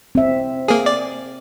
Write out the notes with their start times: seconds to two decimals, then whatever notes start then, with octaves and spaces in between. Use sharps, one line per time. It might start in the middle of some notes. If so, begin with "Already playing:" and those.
0.15 C4 E5
0.68 A#3 G#4
0.86 D5